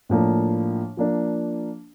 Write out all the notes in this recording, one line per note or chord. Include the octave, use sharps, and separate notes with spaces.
A2 F3 A#3 D4
F3 A#3 D4